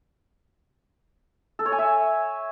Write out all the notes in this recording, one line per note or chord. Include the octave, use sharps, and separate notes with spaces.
A4
C#5
G#5
E5